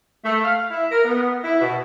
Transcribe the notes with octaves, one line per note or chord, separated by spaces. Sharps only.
A3
F5
E4
A#4
B3
E4
B2